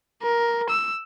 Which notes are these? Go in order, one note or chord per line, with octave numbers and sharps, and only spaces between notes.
A#4
E6